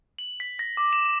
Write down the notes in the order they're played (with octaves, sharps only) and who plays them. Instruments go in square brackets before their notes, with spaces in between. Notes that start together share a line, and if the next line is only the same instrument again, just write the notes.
[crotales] F#7
B6
A#6
D6
E7
E7